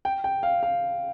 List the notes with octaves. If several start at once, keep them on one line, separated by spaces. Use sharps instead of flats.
G5
G5
F5
F5